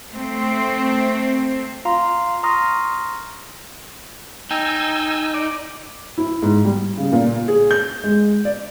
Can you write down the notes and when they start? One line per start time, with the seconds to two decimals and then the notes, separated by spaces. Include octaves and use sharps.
0.13 A3 C4
1.85 F4 F5 A#5 C6
2.43 A#5 C6 C#6 D#6 F6 A#6
4.51 D#4 G5 G#5 E6
5.34 D5
6.18 E4
6.43 G#2
6.65 G3
6.98 C#3
7.12 A#2
7.48 G#4
7.71 G6
8.04 G#3
8.45 D5